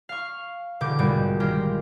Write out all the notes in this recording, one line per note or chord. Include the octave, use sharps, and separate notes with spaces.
F5 C#6
E1 B2 D3 D6 G6
A#1 G#2 B2 G3 D7
D#3 G#3 F4 G4 A#4